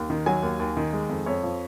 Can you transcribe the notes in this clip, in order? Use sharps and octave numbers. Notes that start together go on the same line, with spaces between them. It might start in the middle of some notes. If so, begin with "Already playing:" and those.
Already playing: D#2
D#3
F#3 G#5
D#2
D#2
D#3
G#3
F2
F2 C#5
F3